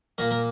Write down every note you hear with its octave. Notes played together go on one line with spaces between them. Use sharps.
A#2 A#3 A#4
A#4